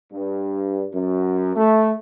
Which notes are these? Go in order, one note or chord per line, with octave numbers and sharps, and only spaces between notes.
G2
F#2
A3